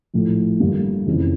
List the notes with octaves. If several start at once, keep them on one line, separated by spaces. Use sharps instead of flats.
A#1 A2 F3 A3
G1 G2 D3 G3 A#3
F1 F2 C#3 E3